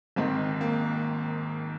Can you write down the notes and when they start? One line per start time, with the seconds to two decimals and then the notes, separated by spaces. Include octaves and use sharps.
0.16 G#1 G#2 D#3 C4
0.61 A#3